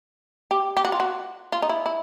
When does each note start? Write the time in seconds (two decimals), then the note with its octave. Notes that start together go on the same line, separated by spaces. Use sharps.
0.51 G4
0.77 G4
0.85 F#4
0.92 F4
1.00 F#4
1.52 F4
1.62 D#4
1.69 E4
1.86 E4